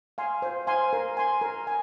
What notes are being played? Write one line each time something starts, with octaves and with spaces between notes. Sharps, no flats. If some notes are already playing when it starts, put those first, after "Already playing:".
F5 G#5 C6
C5
F5 G#5 C6
A#4
G#5 C6
A#4
G#5